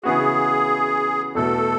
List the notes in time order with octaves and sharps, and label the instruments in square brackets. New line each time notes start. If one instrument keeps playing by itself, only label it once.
[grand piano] C#3 E3 B3 F#4 [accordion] G#4
[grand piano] E2 B2 A3 [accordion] A4